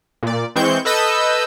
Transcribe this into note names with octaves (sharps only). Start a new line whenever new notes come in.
A#2 D5
E3 G#3 C4 C#6 G6
A4 B4 D#5 E6 G6